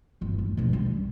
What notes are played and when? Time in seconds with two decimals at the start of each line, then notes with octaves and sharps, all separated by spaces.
0.21 G1 D#4
0.38 D1
0.57 A#1 B2
0.73 G3 C#4
0.86 G3